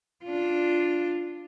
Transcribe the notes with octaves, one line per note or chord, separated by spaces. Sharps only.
D4 F4